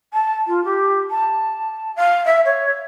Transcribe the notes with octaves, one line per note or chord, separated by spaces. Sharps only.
A5
F4
G4
A5
F5
E5
C#5